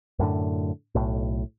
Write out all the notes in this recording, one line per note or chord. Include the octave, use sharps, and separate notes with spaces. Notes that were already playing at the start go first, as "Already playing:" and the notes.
F#2 A2 D3
B1 A2